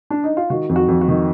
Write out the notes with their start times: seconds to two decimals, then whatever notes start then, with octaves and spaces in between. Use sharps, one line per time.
0.10 D4
0.24 D#4
0.37 F4
0.50 D#3 F#4
0.69 F2
0.76 F#4
0.88 F2
1.01 F#4
1.08 D#3